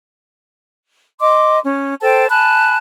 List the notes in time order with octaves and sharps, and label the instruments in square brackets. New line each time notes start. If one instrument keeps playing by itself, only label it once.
[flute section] D#5 C6 D6
C#4
A4 C5 G5 A5
G#5 A5 B5 F#6